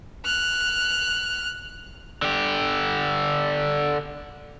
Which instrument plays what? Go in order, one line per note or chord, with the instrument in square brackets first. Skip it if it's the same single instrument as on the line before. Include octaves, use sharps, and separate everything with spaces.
[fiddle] F6 F#6
[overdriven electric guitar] D3 G4